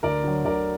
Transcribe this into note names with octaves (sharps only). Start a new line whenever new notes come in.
D2 A#4 D5
D3 F#3
D2 A#4 D5